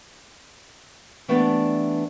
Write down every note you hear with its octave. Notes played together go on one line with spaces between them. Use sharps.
E3 G3 A3 B3 D4